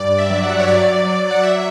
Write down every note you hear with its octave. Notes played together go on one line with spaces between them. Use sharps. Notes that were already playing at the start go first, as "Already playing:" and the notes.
Already playing: G2 D5
E5
F#3
F#5
C#5
F#3 D5
F#3
F#5
F#3 E5